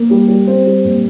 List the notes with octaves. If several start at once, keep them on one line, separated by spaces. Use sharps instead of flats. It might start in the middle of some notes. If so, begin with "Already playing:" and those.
Already playing: A#3
G3
G3
C4
G3
A#2